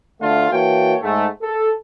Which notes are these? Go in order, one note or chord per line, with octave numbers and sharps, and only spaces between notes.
D2 D3 A3 F4
E3 A#3 F#4 C#5 G5 A5
G#2 A3
A4